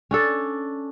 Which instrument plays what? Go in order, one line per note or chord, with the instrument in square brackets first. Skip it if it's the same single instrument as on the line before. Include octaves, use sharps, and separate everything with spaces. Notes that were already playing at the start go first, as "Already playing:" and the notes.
[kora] C#4 D4 A4